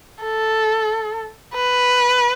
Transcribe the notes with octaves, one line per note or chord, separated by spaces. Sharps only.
A4
B4